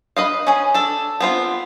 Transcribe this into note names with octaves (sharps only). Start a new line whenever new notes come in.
B4 D#5 F5
C#4 G#4
D4 A4
B3 C4 F4